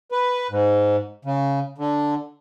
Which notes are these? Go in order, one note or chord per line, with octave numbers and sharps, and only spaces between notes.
B4
G#2
C#3
D3